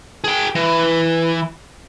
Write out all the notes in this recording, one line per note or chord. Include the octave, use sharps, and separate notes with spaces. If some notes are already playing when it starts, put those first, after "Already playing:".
G#4 G5
E3